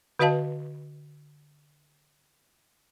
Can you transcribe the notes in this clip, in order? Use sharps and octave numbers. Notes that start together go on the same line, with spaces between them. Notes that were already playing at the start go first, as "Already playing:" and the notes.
D3 F#4 B4 D#5 F5 A5